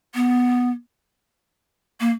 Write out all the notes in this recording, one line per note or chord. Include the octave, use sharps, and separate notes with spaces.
B3
A#3